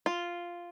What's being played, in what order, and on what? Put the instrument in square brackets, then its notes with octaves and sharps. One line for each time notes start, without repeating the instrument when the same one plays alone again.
[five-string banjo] F4